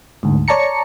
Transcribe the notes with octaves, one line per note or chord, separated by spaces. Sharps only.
D2 G#2
C#5 D5 A5 A#5 C#7